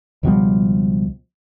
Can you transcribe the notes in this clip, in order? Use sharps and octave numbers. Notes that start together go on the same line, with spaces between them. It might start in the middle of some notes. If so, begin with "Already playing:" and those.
C#2 B2 F3 G3